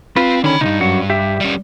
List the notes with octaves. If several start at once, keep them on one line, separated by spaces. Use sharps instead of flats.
C4 F4 B4
D3 D#3 C#4 D4 B5
C2 G2 D#4
F#2 F#4
G4 E5
G3 C#4